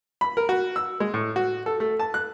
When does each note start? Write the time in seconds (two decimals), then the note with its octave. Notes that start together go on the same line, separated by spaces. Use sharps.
0.21 B5
0.37 A#4
0.49 F#4
0.76 E6
1.00 G#3
1.14 A2
1.36 F#4
1.66 A4
1.80 A3
1.99 A5
2.14 F#6